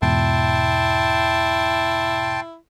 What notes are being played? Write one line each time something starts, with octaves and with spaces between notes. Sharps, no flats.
E2 G#2 B2 E4 G5 A5 C6